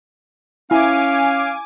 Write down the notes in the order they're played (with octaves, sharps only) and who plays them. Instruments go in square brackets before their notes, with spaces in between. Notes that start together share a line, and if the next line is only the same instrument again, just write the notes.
[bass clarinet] C#4 [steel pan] E4 [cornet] F5 [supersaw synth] G#5 D6